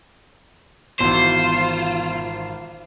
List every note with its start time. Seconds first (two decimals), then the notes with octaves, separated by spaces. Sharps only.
1.00 G#1 B2 E3 F4 C5